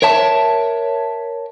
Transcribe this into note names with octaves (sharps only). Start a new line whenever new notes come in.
A#4 C#5 E5 A5